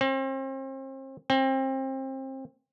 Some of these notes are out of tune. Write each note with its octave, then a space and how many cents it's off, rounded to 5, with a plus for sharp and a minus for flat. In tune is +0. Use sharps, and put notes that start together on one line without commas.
C4 +40
C4 +30